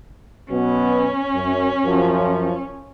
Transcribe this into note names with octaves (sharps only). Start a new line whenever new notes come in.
B2 F#3 B3 C#4
F#2
F#2 F3